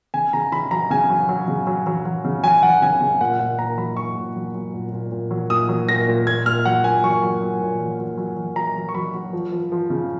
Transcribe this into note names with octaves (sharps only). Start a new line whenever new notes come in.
C#3 G#5
C#3 A#5
C#3 B5
F#3 A#5
C#3 G#5
F#3
F#3
C#3
F#3
F#3
F#3
C#3
F#3 G#5
F#3 F#5
C#3 G#5
C#3
A#2 F#5
A#2 F#5
A#2 A#5
F#3 B5
F#3 C#6
A#2
F#3
F#3
A#2
A#2
A#2
F#3
A#2 D#6
F#3
A#2 A#6
A#2
A#2 G#6
A#2 F6
F#3 F#5
A#2 G#5
F#3 C#6
F#3
F#3
A#2
F#3
F#3
F#3
F#3
F#3 A#5
F#3
C#6
F#3 B5
F#3
F3
F3
F3
C#3